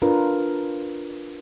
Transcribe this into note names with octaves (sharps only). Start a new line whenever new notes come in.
D4 F4 A#4 B4